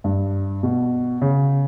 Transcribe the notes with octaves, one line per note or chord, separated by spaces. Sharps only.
G2
B2
C#3